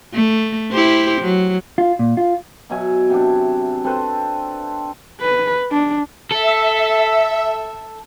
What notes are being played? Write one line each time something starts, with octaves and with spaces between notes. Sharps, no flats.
A3
E4 G4 C5
F#3
F4
A#2
F4
B2 F#3 E5 G#5
C3 F#3 D4
C4 A4 B4 C5
B4
D4
A4 E5